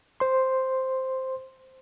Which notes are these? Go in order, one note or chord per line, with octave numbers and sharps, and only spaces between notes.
C5 C6